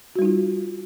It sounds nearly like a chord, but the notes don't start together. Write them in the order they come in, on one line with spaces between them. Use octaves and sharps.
F#4 G3 D#4 F4